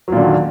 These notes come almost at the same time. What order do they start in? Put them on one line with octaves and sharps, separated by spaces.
F#3 A#2 D3 D#3